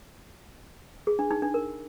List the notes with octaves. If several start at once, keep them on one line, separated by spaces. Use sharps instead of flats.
G#4
D4
D#4
D4
A#4